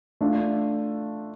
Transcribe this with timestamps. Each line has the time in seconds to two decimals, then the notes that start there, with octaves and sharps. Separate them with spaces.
0.21 A3 D4 F4